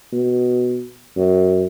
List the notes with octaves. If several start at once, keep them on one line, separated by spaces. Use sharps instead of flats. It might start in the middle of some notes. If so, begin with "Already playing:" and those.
B2
F#2